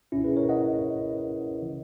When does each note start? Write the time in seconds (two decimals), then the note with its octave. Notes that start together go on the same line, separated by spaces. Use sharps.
0.12 C#2 B2 C#4 E4
0.24 G#4 B4
0.36 A#4 C#5
0.49 D#5 F#5
1.62 C#3 E3